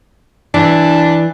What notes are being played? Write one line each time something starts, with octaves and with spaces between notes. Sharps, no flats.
E3 D4